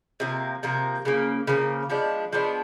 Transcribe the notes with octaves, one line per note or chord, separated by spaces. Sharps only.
C3 F3 A#3
C3 F3 A#3
C#3 F3 A#3
C#3 F3 A#3
F3 G#3 B3 D4
F3 G#3 B3 D4